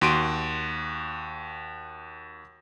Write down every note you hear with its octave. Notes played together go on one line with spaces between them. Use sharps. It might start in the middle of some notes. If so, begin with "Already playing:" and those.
D#2 F#4 C6 D7 D#7